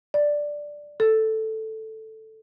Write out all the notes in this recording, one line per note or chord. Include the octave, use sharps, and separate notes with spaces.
D5
A4